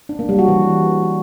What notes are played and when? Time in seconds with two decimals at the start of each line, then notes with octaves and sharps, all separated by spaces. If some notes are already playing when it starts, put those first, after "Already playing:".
0.09 D4
0.19 A#3
0.29 G3
0.39 F#4
0.48 E3